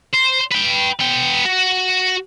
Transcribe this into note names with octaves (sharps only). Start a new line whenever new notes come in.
C5
B4 G5
B3 G5
F#4